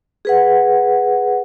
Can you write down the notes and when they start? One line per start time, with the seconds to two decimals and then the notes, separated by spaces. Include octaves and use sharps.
0.25 G#4 B4 F#5